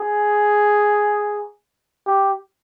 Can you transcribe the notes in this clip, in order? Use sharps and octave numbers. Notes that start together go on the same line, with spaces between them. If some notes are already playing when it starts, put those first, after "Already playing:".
Already playing: G#4
G4